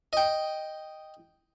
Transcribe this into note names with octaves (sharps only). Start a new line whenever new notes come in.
D#5 G5